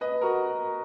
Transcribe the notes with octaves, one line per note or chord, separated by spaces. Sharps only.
B4 D#5
F#4 A#4